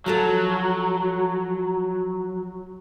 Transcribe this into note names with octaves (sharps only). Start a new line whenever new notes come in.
F3 F#3 F#4 A4